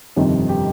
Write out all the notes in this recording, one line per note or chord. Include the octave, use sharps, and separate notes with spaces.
G1 F2 C3 D#3
G4